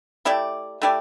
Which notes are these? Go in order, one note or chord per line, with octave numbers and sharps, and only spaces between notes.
A3 E4 G4 D5
A3 E4 G4 D5